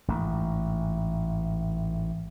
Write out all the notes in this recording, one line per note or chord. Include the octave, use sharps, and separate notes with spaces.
A1 G#2